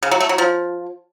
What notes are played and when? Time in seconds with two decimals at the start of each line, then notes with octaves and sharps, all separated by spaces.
0.03 C#3
0.11 F#3
0.20 A3
0.29 F#3
0.38 F3